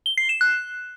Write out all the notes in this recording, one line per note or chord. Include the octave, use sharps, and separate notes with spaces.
G7
C7
E7
F#6